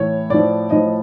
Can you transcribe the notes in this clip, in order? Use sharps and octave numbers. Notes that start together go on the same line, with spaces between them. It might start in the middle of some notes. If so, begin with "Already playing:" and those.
Already playing: A2 E3 C#5
A2 F3 D5
A2 F3 D#5